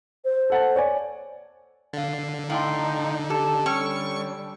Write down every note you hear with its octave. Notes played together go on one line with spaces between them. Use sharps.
C5
A4 F#5 A5
C#5 D5 G#5
D3 F5 A6
A2 D#4 F5 G5 C6
G4 A4 A5
D3 G3 C#4 G5 C#6 E6 F6